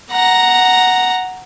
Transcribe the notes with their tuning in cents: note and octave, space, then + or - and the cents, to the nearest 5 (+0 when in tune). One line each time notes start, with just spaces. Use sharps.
F#5 +0 A#5 +0